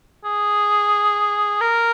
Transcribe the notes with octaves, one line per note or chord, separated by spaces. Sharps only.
G#4
A#4